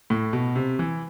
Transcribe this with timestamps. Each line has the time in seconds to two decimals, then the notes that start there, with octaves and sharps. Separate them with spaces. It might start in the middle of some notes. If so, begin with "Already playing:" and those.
0.10 A2
0.33 B2
0.56 C3
0.79 E3